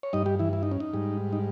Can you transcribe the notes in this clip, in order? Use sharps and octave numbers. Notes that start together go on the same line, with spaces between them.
C#5
G2 G3 D#4 D#5
G3 G4
E3 E4
E4
D#4
C#4
D#4
G#2 G3
D#4